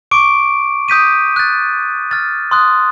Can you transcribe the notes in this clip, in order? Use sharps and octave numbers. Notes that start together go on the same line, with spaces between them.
C#6 D6 D7
D#6 G6 B6 D#7
F#6 A6
F6 A6
C6 D#6 F#6